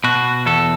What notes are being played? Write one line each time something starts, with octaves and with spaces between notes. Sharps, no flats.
B2 F#4
E2 A4